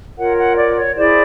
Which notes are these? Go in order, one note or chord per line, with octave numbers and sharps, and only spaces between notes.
F4 A#4 C#5 F#5
F#5
D5
C#5
E4 G#4 C5 D5